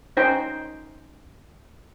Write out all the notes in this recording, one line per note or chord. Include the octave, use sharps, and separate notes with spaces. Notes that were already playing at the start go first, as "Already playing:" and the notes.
C#4 D#4 C5 G5